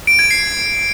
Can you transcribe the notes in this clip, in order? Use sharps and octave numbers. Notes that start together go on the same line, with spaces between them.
D7
G#6
C7